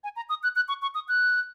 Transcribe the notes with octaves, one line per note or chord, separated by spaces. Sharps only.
G#5
A#5
D#6
F#6
F#6
C#6
C#6
D#6
F#6